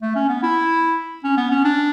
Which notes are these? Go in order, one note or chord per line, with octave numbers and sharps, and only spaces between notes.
A3
C#4
B3
E4
C#4
B3
C#4
D4